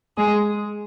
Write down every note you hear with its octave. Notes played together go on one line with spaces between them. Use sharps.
G#3 G#4